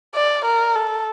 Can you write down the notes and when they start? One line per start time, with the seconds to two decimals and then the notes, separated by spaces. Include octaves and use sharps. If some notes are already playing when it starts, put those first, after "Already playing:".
0.15 D5
0.45 A#4
0.75 A4